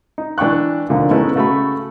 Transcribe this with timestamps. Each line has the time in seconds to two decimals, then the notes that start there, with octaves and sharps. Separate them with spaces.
0.18 D#4
0.38 E3 D4 G5 C#6 F#6
0.89 D#2 A#2 D3 F3
1.11 G#3 A3 B3 C#4 D#4 E4
1.36 C#3 A3 F#4 B5